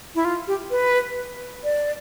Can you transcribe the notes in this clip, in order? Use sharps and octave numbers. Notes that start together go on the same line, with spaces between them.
E4
F4
G4
B4
D5